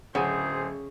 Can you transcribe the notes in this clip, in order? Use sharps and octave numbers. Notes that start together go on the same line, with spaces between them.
D1 C#3 F#3 G#4 C5 F#5 G#5